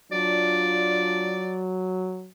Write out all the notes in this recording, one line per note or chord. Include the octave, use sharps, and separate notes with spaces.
F#3 D4 F4 D5